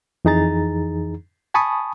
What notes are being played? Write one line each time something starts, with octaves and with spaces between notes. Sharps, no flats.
F2 E3 D#4 G#4 A#5 A6
G#5 A5 B5 C#6 D#6